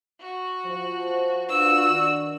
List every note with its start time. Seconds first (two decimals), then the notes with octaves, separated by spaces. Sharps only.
0.20 F#4
0.66 F3 C5
1.49 D4 F4 F#4 B4 E6
1.89 D#3 D4